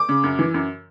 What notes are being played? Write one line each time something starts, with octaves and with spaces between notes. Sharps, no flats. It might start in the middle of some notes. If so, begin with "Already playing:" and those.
Already playing: D6
C#3
F#2
E3
F#2